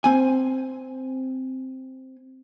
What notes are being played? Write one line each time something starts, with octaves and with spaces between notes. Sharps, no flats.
C4 G#5